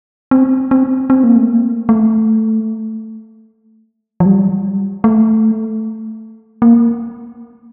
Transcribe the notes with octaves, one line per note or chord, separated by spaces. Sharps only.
C4
C4
C4
A#3
A3
A#3
A3
F3
G3
A3
A#3